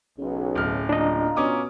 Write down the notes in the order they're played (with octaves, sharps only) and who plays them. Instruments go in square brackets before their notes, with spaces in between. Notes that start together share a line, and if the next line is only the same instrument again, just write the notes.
[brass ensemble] B1 [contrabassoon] C#3
[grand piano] D1 F6
[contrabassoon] F#1 [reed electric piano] D4 D#5 [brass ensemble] F4 A#5
[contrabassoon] B2 [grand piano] C#4 D6 D#6